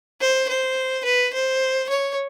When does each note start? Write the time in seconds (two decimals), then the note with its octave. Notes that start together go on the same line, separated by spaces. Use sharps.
0.21 C5
0.49 C5
1.05 B4
1.33 C5
1.89 C#5